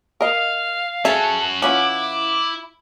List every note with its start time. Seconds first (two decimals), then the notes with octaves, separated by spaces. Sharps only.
0.21 A#4 D#5 F5
1.05 C#4 F#4 G#4 A4 E5 A5
1.62 E3 C#4 E4 F4 F#5 D6